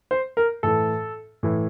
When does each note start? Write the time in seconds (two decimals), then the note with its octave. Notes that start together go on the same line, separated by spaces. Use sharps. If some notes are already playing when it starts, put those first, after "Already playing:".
0.11 C5
0.37 A#4
0.63 A2 E3 A4
1.43 A2 E3